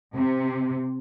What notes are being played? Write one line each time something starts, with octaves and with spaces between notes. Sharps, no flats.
C3